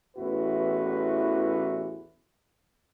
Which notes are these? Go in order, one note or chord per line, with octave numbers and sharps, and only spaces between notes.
A1 E2 E3 E4 F#4 B4